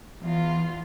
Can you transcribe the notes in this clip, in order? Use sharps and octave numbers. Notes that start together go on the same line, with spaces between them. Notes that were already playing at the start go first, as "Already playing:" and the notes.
E2 F4